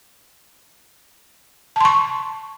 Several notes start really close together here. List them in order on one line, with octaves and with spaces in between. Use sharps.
A5 C6 C#6